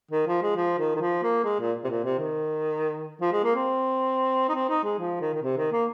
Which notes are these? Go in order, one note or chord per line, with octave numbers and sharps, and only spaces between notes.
D#3
F3
G#3
F3
D#3
D#3
F3
A#3
G#3
A#2
C3
A#2
C3
D#3
F3
G#3
A#3
C4
D#4
C4
D#4
G#3
F3
D#3
D#3
C3
D#3
A#3